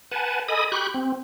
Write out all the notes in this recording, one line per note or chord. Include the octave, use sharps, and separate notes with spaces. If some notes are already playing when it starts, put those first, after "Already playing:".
B4 F#5 G#5 A5
A4 D#5 G#5 B5 D#6
G4 B5 C#6 F#6 G6
C4